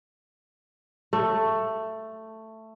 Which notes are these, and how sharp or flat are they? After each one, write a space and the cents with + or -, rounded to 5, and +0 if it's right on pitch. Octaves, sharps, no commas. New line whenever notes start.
A3 +10